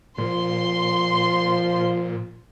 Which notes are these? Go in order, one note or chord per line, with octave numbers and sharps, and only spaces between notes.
A#2 F3 C6